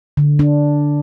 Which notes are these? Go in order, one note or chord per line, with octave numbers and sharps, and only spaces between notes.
D3
D4